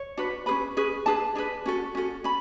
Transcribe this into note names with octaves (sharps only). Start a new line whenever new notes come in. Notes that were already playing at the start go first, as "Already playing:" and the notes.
Already playing: C#5
D4 F#4 B4
C#4 G#4 B4 B5
C#4 G#4 B4
D4 G#4 B4 A5
D4 G#4 B4
C#4 F#4 A4
C#4 F#4 A4
C#4 B5